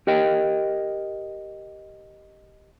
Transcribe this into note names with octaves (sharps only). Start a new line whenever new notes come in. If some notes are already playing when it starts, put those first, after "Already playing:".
G4 A#4 D#5 G5